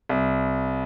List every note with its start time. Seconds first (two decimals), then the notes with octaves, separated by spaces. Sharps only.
0.09 C2